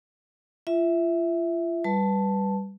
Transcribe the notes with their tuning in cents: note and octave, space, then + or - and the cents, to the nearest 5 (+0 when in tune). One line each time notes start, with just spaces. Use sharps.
F4 -35 E5 -5
G3 +0 B4 +0 A5 +0